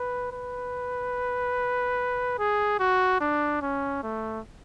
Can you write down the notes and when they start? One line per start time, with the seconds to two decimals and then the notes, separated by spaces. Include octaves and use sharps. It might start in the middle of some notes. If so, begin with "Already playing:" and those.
Already playing: B4
0.33 B4
2.38 G#4
2.80 F#4
3.21 D4
3.62 C#4
4.03 A3